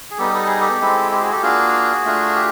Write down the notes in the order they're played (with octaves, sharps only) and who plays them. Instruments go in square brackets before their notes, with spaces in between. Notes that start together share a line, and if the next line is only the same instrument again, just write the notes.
[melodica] G#4
G3 B3 D#4 G4 A4
A4
G#4
G4 A4
G#3 C4 E4
G4
F#4 G#4
G4 A4
A#3 D4 F4 F#4 G#4
A3 D4 F4
G4